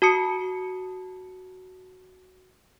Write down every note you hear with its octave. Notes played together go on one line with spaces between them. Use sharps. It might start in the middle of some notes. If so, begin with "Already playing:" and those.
F#4 A5 D#6 C#7